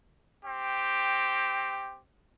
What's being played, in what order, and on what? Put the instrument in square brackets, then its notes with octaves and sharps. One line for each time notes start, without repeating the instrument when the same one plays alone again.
[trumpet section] C4 G4